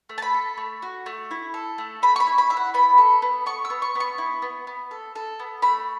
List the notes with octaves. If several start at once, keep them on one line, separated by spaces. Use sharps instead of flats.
A3
A5
B5
A4
A3
F#4
A3
E4
A4
A3
A3 B5
C#6
B5
E4
B5
E4 E5
F#5
B3 B5
A4
B3
B3 C#6
E6
B3
C#6
B3
C#6
E4
B3
B3
A4
A4
B3
A3 B5